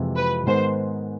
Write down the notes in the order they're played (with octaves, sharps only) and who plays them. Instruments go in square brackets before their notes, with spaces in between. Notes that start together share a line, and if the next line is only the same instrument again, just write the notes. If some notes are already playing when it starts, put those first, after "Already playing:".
Already playing: [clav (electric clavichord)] F2 C3 E3 G#3
[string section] B4
[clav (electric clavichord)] G#2 D#3 G#3 B3 D#4 [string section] C5